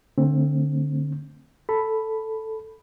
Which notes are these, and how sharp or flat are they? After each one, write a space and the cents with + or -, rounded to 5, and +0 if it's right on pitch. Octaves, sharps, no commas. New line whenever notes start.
D3 +0 A3 +40 C4 +20
A4 +0 B5 +0